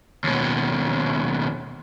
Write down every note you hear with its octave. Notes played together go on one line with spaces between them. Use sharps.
D#2 B2